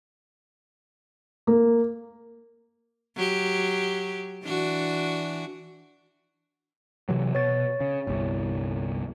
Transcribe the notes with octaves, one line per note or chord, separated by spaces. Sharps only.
A#3
F#3 G4
E3 D4 F#4
C3 E3 F#3
B2 C#5 A6
C#3
G1 C2